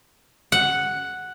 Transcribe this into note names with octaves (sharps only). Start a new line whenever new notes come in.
F#5